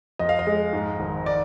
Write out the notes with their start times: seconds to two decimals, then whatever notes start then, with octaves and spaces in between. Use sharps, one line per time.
0.19 F2 D#5
0.29 F5
0.39 D#5
0.47 G#3
0.73 G#2
1.00 G#1
1.26 D5